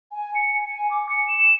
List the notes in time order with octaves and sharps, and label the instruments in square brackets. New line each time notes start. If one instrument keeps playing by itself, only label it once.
[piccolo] G#5
C#7
G#5
D6
C#7
E7